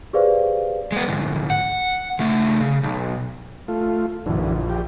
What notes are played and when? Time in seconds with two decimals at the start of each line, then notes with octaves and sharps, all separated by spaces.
0.13 G4 G#4 B4 C5 D5 F5
0.92 G#3 B3
1.08 D2 G#2
1.50 F#5
2.19 C#3 A3
2.61 C#3
2.83 B1
3.68 A3 F4
4.26 A#1 F#2 D3 E3
4.70 G4